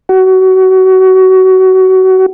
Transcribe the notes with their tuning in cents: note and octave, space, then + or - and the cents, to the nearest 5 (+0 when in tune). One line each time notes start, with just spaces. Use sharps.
F#4 +25